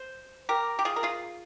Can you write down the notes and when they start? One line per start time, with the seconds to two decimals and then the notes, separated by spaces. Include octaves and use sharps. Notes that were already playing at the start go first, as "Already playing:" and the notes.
Already playing: C5
0.49 G4 A#4
0.79 G4
0.85 F4 G#4
0.96 A#4
1.03 F4 G#4